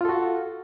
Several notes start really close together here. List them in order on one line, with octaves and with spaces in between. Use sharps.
F4 A4 F#4